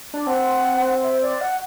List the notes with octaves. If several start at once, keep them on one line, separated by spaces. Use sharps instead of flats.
D4
C4 F#5
E5
D5
F#5